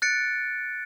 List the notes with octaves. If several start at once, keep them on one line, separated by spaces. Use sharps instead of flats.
F#6 A6 C#7 D7